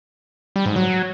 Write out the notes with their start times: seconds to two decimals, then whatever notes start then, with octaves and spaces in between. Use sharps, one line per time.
0.56 G3
0.66 G#2
0.76 F#3